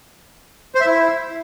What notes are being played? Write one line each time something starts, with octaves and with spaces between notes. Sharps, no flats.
C5
E5
E4